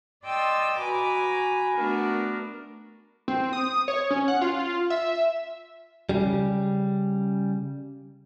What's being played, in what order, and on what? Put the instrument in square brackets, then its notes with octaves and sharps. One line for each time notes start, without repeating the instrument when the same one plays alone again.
[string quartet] D5 D#5 G5 C6 E6 A6
F#4 B4 G#5 A#5 B5 D6
A3 B3 D4 F#4 A#4
[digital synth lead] C4
D#6
C#5
C#4
F#5
F4
E5
[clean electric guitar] C#3 G3